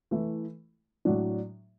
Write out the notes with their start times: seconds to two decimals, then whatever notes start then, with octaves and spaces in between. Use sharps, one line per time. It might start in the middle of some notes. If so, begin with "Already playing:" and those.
0.11 E3 A3 E4
1.05 A2 F#3 D4